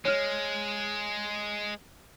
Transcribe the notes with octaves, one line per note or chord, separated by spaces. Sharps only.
G#3 C#5 F6